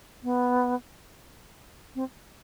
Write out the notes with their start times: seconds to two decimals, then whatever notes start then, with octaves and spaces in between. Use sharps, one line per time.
0.23 B3
1.95 C4